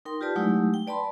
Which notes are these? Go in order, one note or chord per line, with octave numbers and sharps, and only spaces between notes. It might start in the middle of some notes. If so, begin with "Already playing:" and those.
D#4 A#4 G5 C6
F4 G4 B4 D5 A5
F#3 G#3 A3 D#4 E4 G4
G5
B4 D5 A5 B5 C6